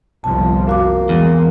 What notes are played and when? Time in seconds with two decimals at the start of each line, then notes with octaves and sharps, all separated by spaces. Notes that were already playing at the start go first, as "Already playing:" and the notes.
0.24 G1 C2 F3 A5
0.67 F#2 A#3 F#4 D6
1.09 E2 G#3